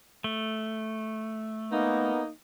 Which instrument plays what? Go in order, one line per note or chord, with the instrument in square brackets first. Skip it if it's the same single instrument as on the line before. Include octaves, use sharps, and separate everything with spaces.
[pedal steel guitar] A3
[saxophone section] A#3 D#4 [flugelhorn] B3